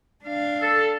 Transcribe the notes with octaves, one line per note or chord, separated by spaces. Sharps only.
D4 F5
A4